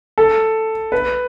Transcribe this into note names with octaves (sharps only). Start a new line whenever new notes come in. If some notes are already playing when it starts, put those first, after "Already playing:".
A4
B4